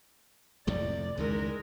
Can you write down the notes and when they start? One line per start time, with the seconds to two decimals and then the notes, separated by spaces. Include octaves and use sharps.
0.67 F2 A2 C3 D5
1.18 C#2 D#3 E3 G#3 A#4